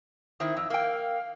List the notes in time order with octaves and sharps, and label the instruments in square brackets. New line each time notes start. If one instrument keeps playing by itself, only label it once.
[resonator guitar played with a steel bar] D#3 C4 E4 [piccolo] D#6
[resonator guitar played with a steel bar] F2 [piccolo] E6
[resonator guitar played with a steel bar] A#3 G5 [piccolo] F5